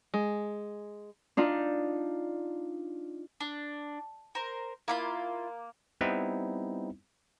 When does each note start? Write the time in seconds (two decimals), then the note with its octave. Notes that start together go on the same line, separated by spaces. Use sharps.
0.14 G#3
1.37 D4 D#4 F4
3.40 D4
4.35 A#4 C5
4.88 A#3 E4 F4 B5
6.01 G3 B3 C4 D#4 E4